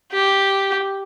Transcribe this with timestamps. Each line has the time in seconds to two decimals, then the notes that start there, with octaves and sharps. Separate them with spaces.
0.12 G4